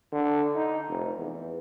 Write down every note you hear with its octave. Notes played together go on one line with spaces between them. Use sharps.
D3
D#4
F1
E2